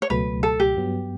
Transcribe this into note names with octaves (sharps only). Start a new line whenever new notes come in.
C#5
C#2 B2 F#3 A3 B4
A4
G4
G2 F#3 B3